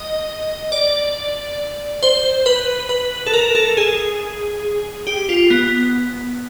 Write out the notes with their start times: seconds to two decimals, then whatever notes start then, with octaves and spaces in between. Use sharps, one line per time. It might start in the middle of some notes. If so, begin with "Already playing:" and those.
Already playing: D#5
0.72 D5
2.03 C5
2.46 B4
2.89 B4
3.26 A4
3.33 A#4
3.55 A4
3.77 G#4
5.07 G4
5.29 F4
5.50 B3